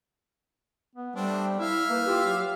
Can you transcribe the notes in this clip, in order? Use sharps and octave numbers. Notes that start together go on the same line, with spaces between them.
B3
G3 A3 C4 D4
E4 E5 F5
A#3 B4
F4 G4
F#3